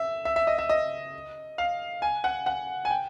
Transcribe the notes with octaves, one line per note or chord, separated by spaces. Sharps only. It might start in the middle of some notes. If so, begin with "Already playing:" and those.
Already playing: E5
E5
E5
D#5
E5
D#5
F5
G#5
F#5
F#5
G#5
G5